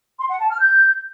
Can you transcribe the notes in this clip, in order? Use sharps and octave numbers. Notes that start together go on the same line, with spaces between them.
C6
F#5
A5
F6
G6